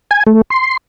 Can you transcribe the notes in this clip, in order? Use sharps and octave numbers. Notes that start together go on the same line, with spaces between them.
G#5
A3
C6